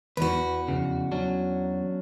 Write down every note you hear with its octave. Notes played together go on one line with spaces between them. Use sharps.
E2 F#4 B4
F2 A#2 C#3
F#3 C#4 D4